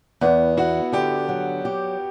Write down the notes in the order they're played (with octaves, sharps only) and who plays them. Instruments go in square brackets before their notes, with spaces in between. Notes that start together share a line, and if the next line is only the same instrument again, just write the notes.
[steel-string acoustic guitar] E2 [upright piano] B3
[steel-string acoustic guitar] E4 [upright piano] F#4
[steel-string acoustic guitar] D3 [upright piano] G4
[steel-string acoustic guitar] F#3
G4